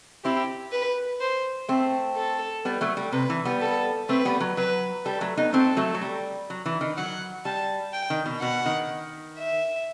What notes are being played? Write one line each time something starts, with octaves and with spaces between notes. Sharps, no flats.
C4 E4 G4
B4
C5
A3 C4
A4
G3 B3
F#3 A3
G3
C3 B4
E3
G3 B3
A4
A3 C4 B4
G3 B3
F#3
F#3 B4
G3 A4
F#3 A3
B3 D#4
A3 C4 A4
F#3 A3
F#3
G3
F#3
E3
D#3
F#3 F#5
G3 A5
G5
D#3
B2
B2 F#5
D#3
E5